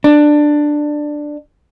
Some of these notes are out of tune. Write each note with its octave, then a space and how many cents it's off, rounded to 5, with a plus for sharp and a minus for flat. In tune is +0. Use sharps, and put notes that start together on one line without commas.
D4 +10